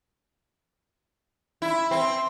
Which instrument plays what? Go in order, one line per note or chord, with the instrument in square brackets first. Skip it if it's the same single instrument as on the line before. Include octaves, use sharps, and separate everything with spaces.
[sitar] E4
C4